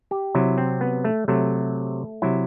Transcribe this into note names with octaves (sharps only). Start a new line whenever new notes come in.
G4
C3 F#3 E4
C4
B3
A3
C3 F#3 A3
C3 F#3 E4